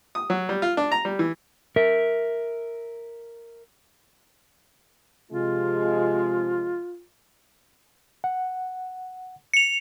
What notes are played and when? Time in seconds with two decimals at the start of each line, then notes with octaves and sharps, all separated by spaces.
0.15 D#6
0.30 F#3
0.49 G3
0.62 F4
0.77 D4
0.92 A#5
1.05 G3
1.19 E3
1.76 A#4 E5
5.31 C3 F3 G#3 F4
8.24 F#5
9.54 C#7 F7